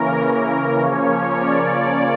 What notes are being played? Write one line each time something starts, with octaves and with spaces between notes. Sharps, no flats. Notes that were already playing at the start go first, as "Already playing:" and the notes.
Already playing: C#3 E3 A#3 C#4 A#4
A#4
C#3 F3 A#3 C#4 C#5
D5